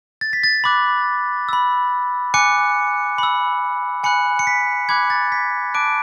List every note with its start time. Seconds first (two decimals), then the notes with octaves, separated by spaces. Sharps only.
0.21 A6
0.33 B6
0.44 A6
0.64 B5 D6 F#6
1.49 B5 E6
2.34 G#5 D6 F#6 C#7
3.18 B5 E6
4.04 G#5 B5 F#6 C#7
4.39 C#7
4.47 B6
4.89 B5 D6 F#6 G#6
5.10 A6
5.32 B6
5.74 A5 D6 F#6 D7